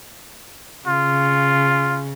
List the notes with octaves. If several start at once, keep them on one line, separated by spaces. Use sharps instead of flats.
C#3 F4